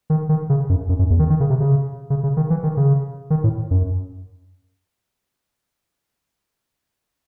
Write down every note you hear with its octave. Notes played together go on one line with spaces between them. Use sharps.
D#3
D#3
C#3
F#2
F#2
F#2
E2
D#3
D#3
C#3
C3
C#3
C#3
C#3
D#3
E3
D#3
C#3
D#3
A2
F#2